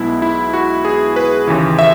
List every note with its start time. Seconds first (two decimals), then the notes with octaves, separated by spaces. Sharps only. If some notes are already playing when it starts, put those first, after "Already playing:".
Already playing: B1 B2 G#3 B3 E4
0.22 E4
0.53 F#4
0.85 G#4
1.16 B4
1.47 D#2 C#3 E3
1.79 E5